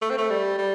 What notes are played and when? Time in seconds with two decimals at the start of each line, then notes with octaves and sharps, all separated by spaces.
0.02 A3
0.10 C4
0.18 A3
0.30 G3
0.58 G3